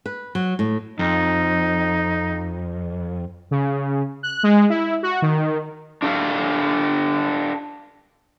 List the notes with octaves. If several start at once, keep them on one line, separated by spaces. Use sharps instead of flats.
B4
F#3
A2
F2 D#4
C#3
F#6
G#3
E4
F#4
D#3
D4 G4 A4 F5